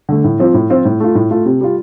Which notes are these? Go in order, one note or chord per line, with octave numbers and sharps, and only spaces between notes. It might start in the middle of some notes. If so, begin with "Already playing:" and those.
D3 A3
A2
F3 C4 F4
A2
F3 C4 F4
A2
A3 F4
A2
A3 F4
C3
G3 F4